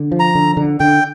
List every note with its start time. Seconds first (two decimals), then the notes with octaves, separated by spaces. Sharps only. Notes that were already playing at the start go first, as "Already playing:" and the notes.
Already playing: D3
0.12 F3
0.20 A#5
0.35 D3
0.57 D3
0.80 D3 G5